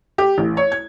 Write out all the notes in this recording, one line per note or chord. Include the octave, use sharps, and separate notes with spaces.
G4
A1
C#5
G#6